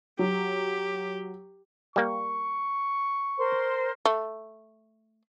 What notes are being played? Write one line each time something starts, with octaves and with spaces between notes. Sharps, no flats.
F#3 G4
G3 A#3 C#6
A#4 C5 C6
A3